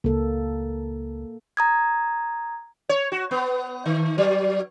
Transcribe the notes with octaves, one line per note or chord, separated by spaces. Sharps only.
C#2 A#3 A4
A#5 D#6 G#6
C#5
F#4
B3
D#3
F#3